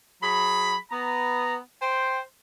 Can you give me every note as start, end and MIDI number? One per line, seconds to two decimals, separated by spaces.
0.22 0.76 54
0.22 0.76 68
0.22 0.76 83
0.90 1.56 59
0.90 1.56 82
1.81 2.20 72
1.81 2.20 79